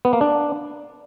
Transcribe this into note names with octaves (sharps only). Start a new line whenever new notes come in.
B3
A#3
D4